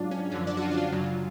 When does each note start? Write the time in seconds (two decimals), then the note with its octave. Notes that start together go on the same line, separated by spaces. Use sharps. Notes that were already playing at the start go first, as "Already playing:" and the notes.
Already playing: G#2 F#3 D4 F4
0.11 C#4
0.32 F#2 D3 F3 C#4
0.47 D4
0.57 F#4
0.62 F4
0.71 D4
0.77 F4
0.92 F#2 C#3 F#3